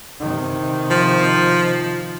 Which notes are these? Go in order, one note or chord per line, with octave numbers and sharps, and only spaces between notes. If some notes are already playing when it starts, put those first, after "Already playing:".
C3 D#3
F3